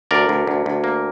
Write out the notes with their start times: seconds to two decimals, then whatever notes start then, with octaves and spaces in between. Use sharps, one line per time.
0.11 D2 A#4 D5
0.29 D2
0.47 D2
0.66 D2
0.84 A#3